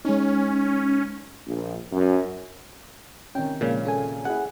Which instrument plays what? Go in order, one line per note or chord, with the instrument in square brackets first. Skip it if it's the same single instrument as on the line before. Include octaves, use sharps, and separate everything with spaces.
[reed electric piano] G#3 D#4 [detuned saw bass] C#4
[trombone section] A#1
F#2
[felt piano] C3 D#3 [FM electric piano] C#4 G5
[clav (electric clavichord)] A#2 C#3 [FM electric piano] F3 G#3 A#3
[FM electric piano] C#4 A4 G#5
[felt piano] E4 G#4 [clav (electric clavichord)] F#5